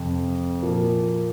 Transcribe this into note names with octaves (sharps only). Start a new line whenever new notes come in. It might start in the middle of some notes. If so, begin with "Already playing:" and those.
Already playing: F2 C3
A#2 F3 A#3